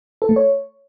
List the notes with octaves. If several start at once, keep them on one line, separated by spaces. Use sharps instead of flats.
A4
A3
C#5